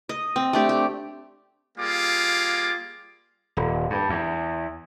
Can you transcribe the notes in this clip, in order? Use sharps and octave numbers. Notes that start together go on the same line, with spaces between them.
D#5
C4
A3 D4 G4
G4
G3 A#3 F4 G#4 D6
D#1
G2
E2